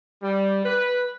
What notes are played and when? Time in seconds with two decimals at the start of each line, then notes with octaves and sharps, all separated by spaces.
0.23 G3
0.64 B4